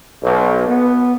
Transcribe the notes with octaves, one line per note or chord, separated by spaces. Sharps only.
B1
B3